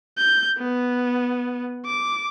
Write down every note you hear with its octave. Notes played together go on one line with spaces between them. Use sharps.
G6
B3
D6